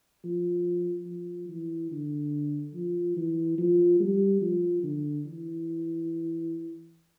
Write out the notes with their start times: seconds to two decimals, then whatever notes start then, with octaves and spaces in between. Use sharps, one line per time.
0.24 F3
1.07 F3
1.49 E3
1.91 D3
2.75 F3
3.17 E3
3.58 F3
4.00 G3
4.42 F3
4.83 D3
5.26 E3